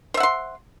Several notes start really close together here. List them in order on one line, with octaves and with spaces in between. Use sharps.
C5 E5 F#5 C6